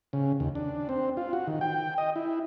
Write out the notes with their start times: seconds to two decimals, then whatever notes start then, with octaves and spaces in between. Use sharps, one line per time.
0.13 C#3
0.40 D#2
0.55 D4
0.89 C4
1.17 F4
1.33 F#4
1.47 D#3
1.61 G5
1.98 D#5
2.16 E4